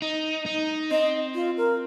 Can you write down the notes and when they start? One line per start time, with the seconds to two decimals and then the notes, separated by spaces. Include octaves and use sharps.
0.02 D#4
0.46 D#4
0.91 C4 D#5
1.35 F4
1.57 A#4